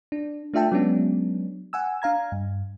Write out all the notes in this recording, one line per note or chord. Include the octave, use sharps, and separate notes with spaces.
D4
A3 D4 F4 E5 G5 A5
F#3 G#3 B3 C#4 D4
F#5 G#5 E6
D4 F5 A#5 G#6
G2